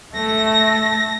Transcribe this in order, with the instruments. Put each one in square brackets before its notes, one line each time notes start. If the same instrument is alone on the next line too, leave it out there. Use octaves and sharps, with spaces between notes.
[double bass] A3 [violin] A#6